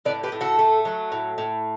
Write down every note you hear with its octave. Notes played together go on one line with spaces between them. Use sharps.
A2 B4 D5
G4 B4
A2
F#4 A4
A3
F#3
A2
A2